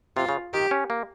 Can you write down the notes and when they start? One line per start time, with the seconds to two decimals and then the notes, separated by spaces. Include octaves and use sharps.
0.17 C3 F4
0.29 C#3
0.53 D#3 G4
0.71 C#4
0.90 A#3